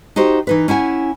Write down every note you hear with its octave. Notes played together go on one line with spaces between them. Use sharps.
D#4 F#4 G4 C5
E3 D#4 B4
C#4 E4 F#5 G#5